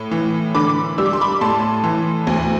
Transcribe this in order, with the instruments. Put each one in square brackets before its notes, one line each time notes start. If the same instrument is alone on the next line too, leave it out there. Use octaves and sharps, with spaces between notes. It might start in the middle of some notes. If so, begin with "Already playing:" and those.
Already playing: [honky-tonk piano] A2
E3
D3 B5 D6
G3 E6
D6
C6
B5 D6
A2 A5 C6
E3
D2